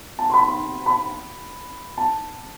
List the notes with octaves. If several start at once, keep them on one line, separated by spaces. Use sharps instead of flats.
A5
C6
B5
C6
B5
A5